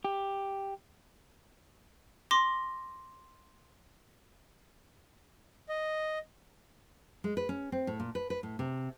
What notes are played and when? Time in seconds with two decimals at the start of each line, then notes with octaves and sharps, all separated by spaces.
0.05 G4
2.31 C6 D6 A#6
5.69 D#5
7.24 G#3
7.37 B4
7.49 C#4
7.72 C4
7.87 A2
8.00 A#2
8.15 B4
8.30 B4
8.43 A2
8.59 C3